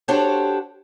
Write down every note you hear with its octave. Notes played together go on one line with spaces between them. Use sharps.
D4 F#4 G4 A4 C5 C#5